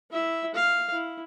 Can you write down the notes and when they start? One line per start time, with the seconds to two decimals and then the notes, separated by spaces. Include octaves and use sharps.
0.11 E4 E5
0.55 F5
0.92 E4